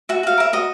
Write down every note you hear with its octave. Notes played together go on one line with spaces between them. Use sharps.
F#4 E5
F#4 F5
A#4 E5
F#4 D#5